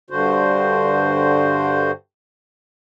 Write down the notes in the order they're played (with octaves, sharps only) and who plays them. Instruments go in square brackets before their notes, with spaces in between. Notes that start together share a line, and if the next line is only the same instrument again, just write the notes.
[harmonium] G2 D3 F#4 C5